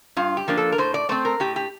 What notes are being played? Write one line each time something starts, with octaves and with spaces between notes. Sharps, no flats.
G2 F4
G4
F3 A#3 D4
A4
A#4
A2 C5
D5
A3 C4 C5
A#4
A2 G4
G4